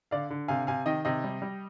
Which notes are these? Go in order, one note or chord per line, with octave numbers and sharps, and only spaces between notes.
D3 D5 F5
D3
C3 F5 G#5
C3 F5 G#5
D#3 D#5 G5
C3 D#5 G5
G3
G3